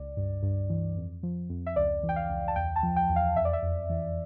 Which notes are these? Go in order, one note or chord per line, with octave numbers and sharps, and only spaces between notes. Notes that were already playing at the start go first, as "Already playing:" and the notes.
Already playing: C#2 D5
G2
G2
E3
F2
F3
F2
E5
C#2 D5
E3
G5
F5
C#2
A5
E2 G5
A5
F3
G5
E2
F5
F2 E5
D5
E5
F2
E3